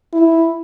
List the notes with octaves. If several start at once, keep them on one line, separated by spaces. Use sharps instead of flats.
E4